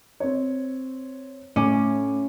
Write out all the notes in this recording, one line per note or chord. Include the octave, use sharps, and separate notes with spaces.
C4 C#5
A2 C#4 D6